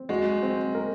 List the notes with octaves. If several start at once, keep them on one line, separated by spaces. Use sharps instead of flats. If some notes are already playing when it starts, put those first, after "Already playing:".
Already playing: C4
G#3 F#4
C4
A#4